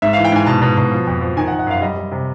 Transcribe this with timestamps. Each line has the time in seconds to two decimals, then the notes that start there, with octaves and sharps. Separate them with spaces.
0.02 G#2 E5
0.13 F5
0.17 E3
0.25 G5
0.32 G#2 G#5
0.46 B2 A5
0.62 B2
0.77 B2
0.92 F3
1.07 F2
1.21 F3
1.37 D#3 G#5
1.47 F#5
1.52 D#3
1.59 F#5
1.67 F#2 F5
1.81 G3 D#5
1.96 G3
2.12 C3